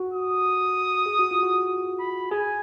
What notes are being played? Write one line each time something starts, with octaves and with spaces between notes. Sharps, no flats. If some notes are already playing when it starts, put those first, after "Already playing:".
Already playing: F#4
D#6
G#4
F#4
F4
F#4
B5
G#4 G#5